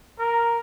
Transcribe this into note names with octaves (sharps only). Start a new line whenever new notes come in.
A#4